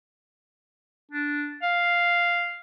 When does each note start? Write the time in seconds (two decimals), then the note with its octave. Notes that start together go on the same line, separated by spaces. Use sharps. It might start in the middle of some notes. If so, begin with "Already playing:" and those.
1.11 D4
1.63 F5